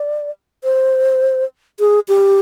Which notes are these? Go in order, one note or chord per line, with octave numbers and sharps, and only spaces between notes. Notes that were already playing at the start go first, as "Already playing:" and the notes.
Already playing: D5
C5
G#4
G4